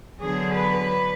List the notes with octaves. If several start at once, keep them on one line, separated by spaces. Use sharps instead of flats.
D3 F#3 B3 G#4
B4